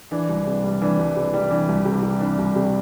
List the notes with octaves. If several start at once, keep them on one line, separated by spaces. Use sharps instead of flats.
E3 D4
C2
C3
G3
E3 D4
C2
C3
G3
E3 D4
C2
C3
G3
E3 D4
C2
C3